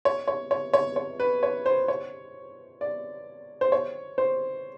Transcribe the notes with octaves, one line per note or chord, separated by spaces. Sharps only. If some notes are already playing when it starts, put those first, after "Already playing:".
C#5
C#5
C#5
C#5
C#5
B4
C#5
C5
C#5
D5
C5
C#5
C5